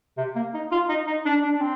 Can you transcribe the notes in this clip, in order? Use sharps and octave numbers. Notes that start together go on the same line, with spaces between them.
C3
A#3
D#4
F4
D#4
D#4
D4
D4
D4
C4